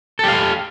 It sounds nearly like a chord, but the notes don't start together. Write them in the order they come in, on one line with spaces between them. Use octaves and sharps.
A4 G4 F5